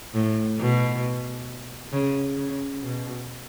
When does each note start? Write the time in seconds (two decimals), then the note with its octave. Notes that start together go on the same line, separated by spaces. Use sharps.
0.14 A2
0.58 B2
1.92 C#3
2.37 C#3
2.82 B2